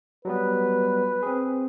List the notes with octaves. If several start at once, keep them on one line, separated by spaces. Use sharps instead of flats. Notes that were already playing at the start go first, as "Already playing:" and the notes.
F#3 G3 B3 B4
C4 G#4